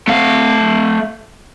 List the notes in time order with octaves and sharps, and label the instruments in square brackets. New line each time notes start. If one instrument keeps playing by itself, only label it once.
[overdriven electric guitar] A3 F5